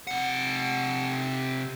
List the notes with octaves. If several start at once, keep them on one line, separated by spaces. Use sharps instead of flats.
C3 F#5